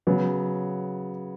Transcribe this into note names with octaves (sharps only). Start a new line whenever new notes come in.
C#3 F#3 B3